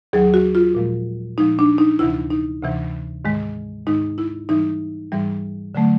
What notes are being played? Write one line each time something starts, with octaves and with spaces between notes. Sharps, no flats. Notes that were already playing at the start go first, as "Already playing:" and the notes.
D#2 D#3 F#3 G#4
F#4
F4
A#2 F3 G#3
A#2 F3 G#3 D#4
D4
D#4
D2 C3 E3 E4
D#4
D2 C3 E3
G#2 D#3 G#3
G#2 D#3 G#3 D#4
E4
G#2 E3 G3 D#4
G#2 E3 G3
D3 F#3 A3